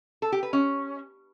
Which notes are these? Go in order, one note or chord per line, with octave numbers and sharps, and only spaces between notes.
A4
G4
B4
C#4